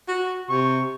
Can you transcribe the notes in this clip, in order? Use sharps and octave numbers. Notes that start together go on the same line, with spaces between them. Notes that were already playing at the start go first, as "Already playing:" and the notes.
F#4
C3 C#6